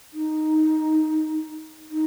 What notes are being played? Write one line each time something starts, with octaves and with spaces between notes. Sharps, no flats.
D#4
D#4